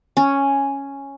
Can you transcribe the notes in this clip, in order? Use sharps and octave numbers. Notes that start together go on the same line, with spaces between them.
C#4